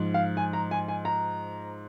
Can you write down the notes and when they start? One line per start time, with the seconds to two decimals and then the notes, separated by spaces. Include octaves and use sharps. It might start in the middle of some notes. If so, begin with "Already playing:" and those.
Already playing: G#2 F3
0.14 F5
0.37 G#5
0.53 A#5
0.71 G#5
0.88 G#5
1.05 A#5